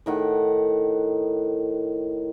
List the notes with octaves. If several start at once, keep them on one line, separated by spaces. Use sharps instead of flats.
A2 D#3 F#5